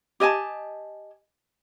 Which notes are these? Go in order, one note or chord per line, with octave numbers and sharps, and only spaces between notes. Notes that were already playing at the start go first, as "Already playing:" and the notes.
G4 D#5 G#5 A5